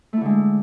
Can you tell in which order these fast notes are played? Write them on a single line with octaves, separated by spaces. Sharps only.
A3 E4 D3 G#3